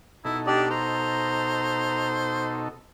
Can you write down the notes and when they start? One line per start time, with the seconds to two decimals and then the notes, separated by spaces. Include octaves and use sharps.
0.25 B2 D#4 E4 A4
0.47 D4 G4 D5 D#5
0.70 C5 A#5